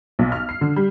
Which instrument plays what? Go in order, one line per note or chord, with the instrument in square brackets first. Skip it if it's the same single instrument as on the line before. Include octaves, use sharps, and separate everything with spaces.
[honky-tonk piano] B1
F6
C7
D3
G3